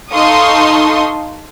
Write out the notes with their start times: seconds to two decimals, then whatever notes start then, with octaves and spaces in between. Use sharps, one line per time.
0.12 D#4 A4 F5 C6 C#6 D#6